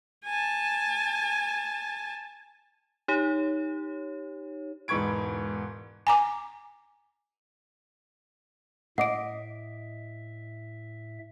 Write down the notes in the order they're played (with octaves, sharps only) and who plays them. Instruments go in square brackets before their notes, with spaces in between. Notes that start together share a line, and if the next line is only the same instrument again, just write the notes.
[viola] G#5 A5
[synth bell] D#4 G4 C#5
[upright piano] E1 G#2 B4 C#6 G#6 D7
[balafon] G#5 A#5 D6
[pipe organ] A2 E5 [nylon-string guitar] D#5 [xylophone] F#5 D6 D7